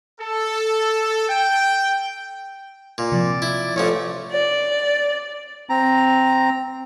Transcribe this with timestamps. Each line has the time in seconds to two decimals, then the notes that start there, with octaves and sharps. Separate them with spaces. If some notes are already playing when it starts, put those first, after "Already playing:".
0.20 A4
1.29 G5
2.98 A#2
3.12 C3 F3 D5
3.42 E4
3.76 A1 F3 A3 C#5
4.31 D5
5.70 C4 A#5